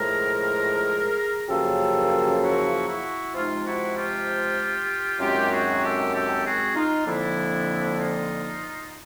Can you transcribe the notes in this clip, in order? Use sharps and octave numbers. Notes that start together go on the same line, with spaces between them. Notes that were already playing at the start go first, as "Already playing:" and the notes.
Already playing: A2 F3 G#3 G#4 A#4
F#2 C#3 F3 A#3 G4 A4
E4 F#4
E4 F#4
C3 F3 G#3 D#4 F4
E4 F#4
F4 G4
F#2 D#3 G#3 C4 F4 G4
F#4 G#4
G4 A4
G4 A4
F#4 G#4
D#4 F4
F2 D3 F3 A#3 D4 E4
D#4 F4